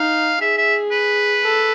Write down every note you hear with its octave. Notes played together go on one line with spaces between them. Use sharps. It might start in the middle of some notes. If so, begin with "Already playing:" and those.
Already playing: D#4 F5
G#4 E5
E5
B4
A4